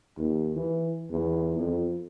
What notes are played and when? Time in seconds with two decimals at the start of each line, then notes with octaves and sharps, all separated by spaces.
0.17 D#2
0.56 E3
1.11 E2
1.59 F2